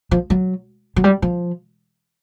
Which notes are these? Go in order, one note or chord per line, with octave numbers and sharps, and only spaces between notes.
F3
F#3
F#3
G3
F3